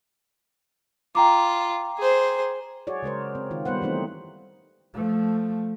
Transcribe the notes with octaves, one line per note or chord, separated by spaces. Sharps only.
F4 G5 A#5 D6
G#4 C5
F#4 G#4 C#5 D5
C#3 G#3 A#4 C5
C4
D#3 F4
G3 B3 B4 C5 F#5
E3 A3 C4 D#4
F3 A3